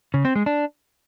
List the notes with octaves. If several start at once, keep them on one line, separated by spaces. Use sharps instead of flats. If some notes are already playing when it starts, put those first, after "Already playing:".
C#3
C4
G#3
D4